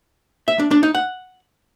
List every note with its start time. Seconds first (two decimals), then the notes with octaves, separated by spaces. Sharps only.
0.48 E5
0.59 D4
0.71 D4
0.83 D#4
0.95 F#5